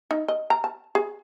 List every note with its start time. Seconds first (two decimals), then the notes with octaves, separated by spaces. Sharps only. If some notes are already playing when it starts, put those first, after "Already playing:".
0.11 D#4
0.28 D#5
0.50 A#5
0.64 A5
0.95 G#4